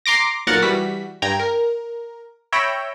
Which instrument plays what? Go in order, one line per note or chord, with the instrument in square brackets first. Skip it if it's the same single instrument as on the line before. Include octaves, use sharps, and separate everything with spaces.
[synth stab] A#5 C6 D6 A#6
B1 A#2 A#4 F#5 A6
E3 G3 F#4 B6
G2 G5 A#5 G#6
A#4
C#5 E5 G5 B5 G6 A#6